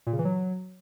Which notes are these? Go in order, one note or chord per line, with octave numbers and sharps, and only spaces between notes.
A#2
C#3
E3
F#3